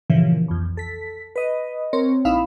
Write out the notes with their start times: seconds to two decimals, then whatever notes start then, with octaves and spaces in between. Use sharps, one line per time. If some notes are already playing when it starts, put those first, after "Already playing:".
0.10 G2 A#2 C#3 E3 F3
0.48 B1 F2
0.77 A4 B6
1.36 B4 D#5
1.93 C4 A#4 C#5
2.25 A#1 D#4 E4 F5 B5 E7